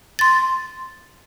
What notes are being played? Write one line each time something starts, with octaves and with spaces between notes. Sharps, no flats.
C6 A6